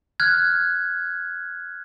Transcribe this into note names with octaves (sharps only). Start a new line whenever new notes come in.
F6 F#6 G#6